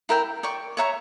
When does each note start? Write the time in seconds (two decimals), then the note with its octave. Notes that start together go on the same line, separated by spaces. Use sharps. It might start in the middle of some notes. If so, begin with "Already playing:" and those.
0.09 E4 A#4 E5 G5
0.43 D5 G5 C#6
0.77 C#5 E5 A#5 C#6